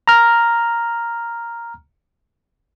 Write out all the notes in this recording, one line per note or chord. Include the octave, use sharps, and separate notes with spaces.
A#5 F6